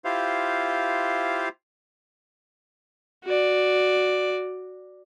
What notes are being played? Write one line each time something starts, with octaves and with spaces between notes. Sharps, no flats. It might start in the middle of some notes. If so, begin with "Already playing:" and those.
E4 F4 G4 C5 F5
F#4 D5